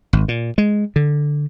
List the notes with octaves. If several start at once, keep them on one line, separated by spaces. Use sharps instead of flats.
G#1
A#2
G#3
D3